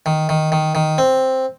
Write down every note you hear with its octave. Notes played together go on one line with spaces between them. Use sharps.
D#3
D#3
D#3
D#3
C4